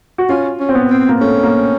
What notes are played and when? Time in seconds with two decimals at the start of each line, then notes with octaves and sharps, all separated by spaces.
0.18 F#4
0.29 C#4 F4
0.60 C#4
0.69 C4
0.75 B3
0.90 C4
1.09 A#3
1.20 A3 C#4
1.43 A#3